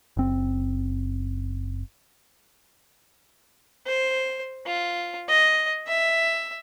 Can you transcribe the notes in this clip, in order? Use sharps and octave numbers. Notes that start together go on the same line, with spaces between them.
F#1 C4
C5
F4
D#5
E5